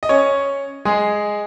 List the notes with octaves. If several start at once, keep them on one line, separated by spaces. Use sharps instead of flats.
D#5
C#4 C#5
G#3 G#4